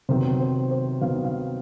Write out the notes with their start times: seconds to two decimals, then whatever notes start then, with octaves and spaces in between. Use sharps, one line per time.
0.09 C3 D#3 F#3 B3 C5
0.40 C5
0.71 C5
1.01 C3 D#3 F#3 B3 F5
1.24 F5